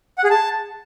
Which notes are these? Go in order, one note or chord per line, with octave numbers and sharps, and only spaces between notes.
F#5
G#4
A5